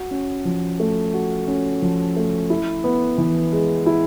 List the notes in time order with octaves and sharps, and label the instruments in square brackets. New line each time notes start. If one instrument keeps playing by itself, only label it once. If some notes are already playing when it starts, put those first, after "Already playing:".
Already playing: [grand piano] F#4
C#4
F3
A3
F#4
C#4
F3
A3
E4
B3
E3
G#3
E4